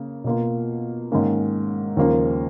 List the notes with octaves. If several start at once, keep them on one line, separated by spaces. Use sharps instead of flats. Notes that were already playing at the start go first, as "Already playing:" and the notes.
Already playing: C#3 A#3
B2 A#3 F4
G#2 D#3 A#3 C#4
D#2 C#3 F3 A#3